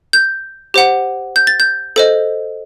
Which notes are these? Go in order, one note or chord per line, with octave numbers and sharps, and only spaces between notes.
G6
G4 C5 F#5
G6
A6
G6
A4 C5 D#5